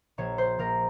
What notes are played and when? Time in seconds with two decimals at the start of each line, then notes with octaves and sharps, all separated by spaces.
0.18 A#1 C#5
0.38 C5
0.58 A#1 A#4